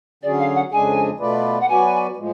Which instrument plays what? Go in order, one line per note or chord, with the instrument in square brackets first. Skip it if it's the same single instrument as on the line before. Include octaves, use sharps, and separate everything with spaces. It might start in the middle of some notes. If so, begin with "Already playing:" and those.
[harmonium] D3 F#3 C#4 G#4 [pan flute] D5
[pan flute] F5
F#5
[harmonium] F2 C#3 G#3 D4 G#4 [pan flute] G#5
[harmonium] B2 A3 F4 B4 D5
[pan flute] F#5
[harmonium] F#3 B3 F#4 B4 D5 [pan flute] G#5
[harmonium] A2 F3 G#3